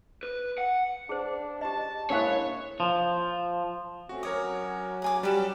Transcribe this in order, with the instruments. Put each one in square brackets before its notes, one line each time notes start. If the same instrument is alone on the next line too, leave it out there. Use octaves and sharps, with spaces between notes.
[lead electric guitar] B4
F#5
[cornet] D4 [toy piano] G#4 C5
[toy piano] G4 D#5 [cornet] A5
[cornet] G#3 [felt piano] A#3 E4 F#6 [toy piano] D4 A#4 F5 [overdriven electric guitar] C#5
[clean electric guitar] F3
[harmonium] A3 C4 C#4 [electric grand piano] F#4
[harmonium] F#3 C#4 F#4 [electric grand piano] A#4 C#5 D6 [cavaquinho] D#6
[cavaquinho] G#4 G#5 D6
[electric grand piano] G3 E7 [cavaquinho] G4 B4